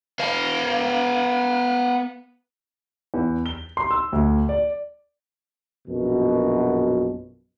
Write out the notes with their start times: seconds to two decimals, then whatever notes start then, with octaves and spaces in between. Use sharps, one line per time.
0.20 B3 F5
3.14 E2
3.46 G7
3.77 C6
3.91 E6
4.13 D2
4.49 D5
5.88 A#1 F#2 B2